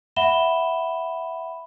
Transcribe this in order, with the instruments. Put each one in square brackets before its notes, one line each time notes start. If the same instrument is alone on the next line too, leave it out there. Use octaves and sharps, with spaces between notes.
[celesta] E5 F#5 B5 E7 G7